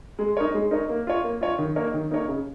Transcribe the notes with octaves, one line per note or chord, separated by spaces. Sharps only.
G#3
D#4 A#4 C#5
G#3
D#4 A#4 C#5
A#3
F4 C#5
A#3
F4 C#5
D#3
A#3 D#4 A#4 C#5
D#3
A#3 D#4 A#4 C#5
C#3